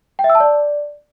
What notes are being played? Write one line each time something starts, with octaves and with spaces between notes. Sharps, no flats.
G5
E5
E6
A5
D5